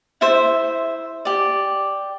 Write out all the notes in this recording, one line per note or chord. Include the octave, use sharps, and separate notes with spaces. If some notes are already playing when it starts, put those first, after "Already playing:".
E4 C5 E5
G4 D5